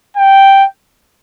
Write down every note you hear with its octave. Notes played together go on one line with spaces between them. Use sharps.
G5